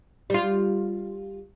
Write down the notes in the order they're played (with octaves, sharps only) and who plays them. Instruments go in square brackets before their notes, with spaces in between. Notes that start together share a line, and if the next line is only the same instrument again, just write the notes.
[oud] G3 F4